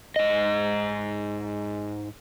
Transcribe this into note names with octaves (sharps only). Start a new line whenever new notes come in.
G#2 D#5